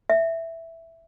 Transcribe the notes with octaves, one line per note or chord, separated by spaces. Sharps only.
E5